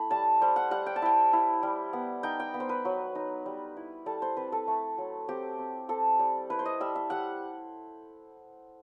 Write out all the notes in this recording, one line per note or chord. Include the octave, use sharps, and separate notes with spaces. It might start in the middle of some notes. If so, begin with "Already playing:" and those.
Already playing: A3 E4 B5
G3 A5
G3 C5
F#5
G3 F#5
G5
A5
E4 G5
E4
G3
B3
D#4 G5
G5
B3
C5
B4
F#3
D#4
G3
E4
G3 A4
C5
C4 B4
A4
A3
F#3
C4 G4
C4
C4 A4
G3
E4 B4
C5
D#5
G3 E5
E5
G3 F#5